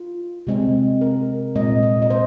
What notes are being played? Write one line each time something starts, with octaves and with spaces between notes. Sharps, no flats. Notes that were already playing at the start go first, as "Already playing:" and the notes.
Already playing: F4
C3 G#3 C4
A#4
A#2 G#3 C4 D#5
D#5
D#5
C5